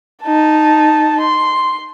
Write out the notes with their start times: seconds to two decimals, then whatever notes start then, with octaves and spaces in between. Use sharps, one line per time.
0.23 D#4 A5
1.21 C6